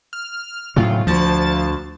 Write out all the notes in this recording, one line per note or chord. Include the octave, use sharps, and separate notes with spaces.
F6
A2 C#3 F#3 F4
D2 F3 A5 A6